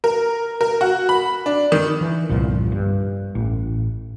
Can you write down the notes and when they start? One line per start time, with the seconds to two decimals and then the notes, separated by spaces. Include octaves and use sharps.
0.04 A#4
0.61 A#4
0.81 F#4
1.09 B5
1.46 D4
1.72 D#3
2.01 E3
2.29 G1 C2 A#2 F3
2.72 G2
3.35 A1